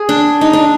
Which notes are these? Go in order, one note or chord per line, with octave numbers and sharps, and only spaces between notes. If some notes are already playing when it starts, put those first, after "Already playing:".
Already playing: G#4
D4
D#4
D4